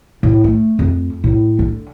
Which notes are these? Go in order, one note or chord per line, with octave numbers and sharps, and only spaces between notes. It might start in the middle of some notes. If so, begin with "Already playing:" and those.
A2
A3
F2
A2
D3